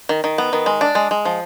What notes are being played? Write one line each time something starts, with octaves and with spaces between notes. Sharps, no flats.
D#3
D#3
B3
D#3
G#3
D4
G#3
G#3
F3